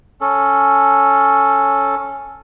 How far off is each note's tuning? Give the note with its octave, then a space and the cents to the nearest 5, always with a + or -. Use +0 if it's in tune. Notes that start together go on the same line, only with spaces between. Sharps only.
C#4 +0 A4 +0